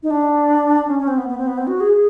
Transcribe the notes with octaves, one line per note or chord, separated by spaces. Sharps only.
D#4
D4
C#4
C#4
C4
B3
B3
C4
B3
C4
F#4
G#4
G#4